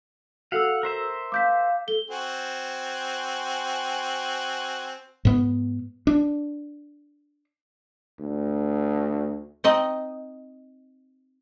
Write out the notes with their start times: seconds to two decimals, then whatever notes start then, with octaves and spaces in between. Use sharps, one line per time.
0.52 F#4 A4 F5 F#5 E6
0.83 A#4 C5 E5
1.32 F5 D6 G6 B6
1.88 A4 G7
2.10 C4 F#4 G#5
5.25 G#2 B3
6.07 D4
8.20 D2
9.64 C4 D#4 D#5